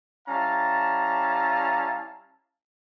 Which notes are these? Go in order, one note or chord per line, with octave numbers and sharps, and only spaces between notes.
G3 C#4 E4 F5 A5 A#5